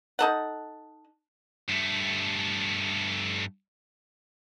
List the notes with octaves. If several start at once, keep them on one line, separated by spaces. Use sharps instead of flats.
D#4 A4 F#5
G2 A3